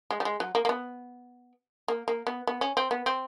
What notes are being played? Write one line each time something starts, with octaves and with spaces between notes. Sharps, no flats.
G#3
G3
G#3
F#3
A#3
A#3
B3
A#3
A#3
B3
B3
C#4
C4
B3
C4